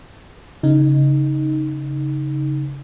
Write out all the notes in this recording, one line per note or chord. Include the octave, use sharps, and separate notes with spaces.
C#3 D#4